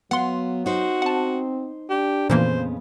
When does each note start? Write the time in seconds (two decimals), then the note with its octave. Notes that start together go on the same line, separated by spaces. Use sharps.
0.11 F#3 B3 F5 F#5 C6
0.66 D#4 F#4 C5
1.02 C4 F#5 A5
1.90 D4 G4
2.30 F2 A#2 C#3 E3 A#3 B3 C5